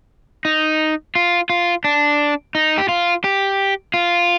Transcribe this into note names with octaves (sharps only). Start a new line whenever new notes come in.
D#4
F4
F4
D4
D#4
G4
F4
G4
F4